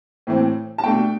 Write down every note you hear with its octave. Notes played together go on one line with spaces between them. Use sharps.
A2 E3 A3 C4
A5
B2 A3 D4 G5